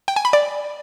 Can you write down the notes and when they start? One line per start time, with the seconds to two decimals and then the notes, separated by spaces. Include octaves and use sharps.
0.08 G5
0.16 G#5
0.25 B5
0.33 D5